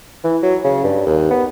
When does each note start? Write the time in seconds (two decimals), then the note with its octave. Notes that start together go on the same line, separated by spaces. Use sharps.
0.24 E3
0.43 F#3
0.64 C#3
0.84 G2
1.06 D#2
1.31 B3